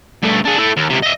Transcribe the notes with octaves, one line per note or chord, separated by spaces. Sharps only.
G2 A3
D4 G#4
A3 E4
D#2
C#2 C3
D#5 E5